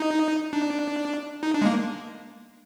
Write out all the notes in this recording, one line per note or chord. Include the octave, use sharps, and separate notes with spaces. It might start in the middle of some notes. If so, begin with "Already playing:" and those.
Already playing: D#4
D4
D#4
D4
G#3
A#3